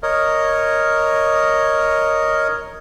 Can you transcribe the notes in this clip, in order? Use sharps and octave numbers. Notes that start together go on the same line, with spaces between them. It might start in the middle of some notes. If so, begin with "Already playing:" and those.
A#4 C#5 D#5